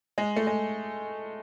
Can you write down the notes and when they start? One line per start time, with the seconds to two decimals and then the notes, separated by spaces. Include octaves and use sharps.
0.18 G#3
0.36 A3
0.47 G#3